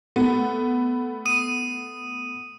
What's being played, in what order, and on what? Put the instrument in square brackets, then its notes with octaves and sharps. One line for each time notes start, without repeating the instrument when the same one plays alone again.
[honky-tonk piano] A3 B3
[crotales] D#6 D#7